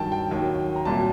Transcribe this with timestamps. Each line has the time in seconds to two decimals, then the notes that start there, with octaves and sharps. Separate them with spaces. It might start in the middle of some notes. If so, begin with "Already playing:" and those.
Already playing: G2 D#3 F#3 G5 A5
0.12 G5
0.31 D#2 D#3 F#3
0.76 A#5
0.85 C2 A#2 F#3 A5